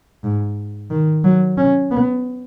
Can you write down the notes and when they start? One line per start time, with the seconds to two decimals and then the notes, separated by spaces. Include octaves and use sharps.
0.24 G#2
0.90 D#3
1.24 F#3
1.58 C#4
1.91 B3